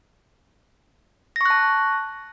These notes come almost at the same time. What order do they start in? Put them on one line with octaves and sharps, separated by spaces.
A#6 C#6 F#6 A5